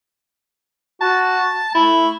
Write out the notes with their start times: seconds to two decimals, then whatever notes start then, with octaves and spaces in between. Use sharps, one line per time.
1.01 F#4 A5
1.75 A3 E4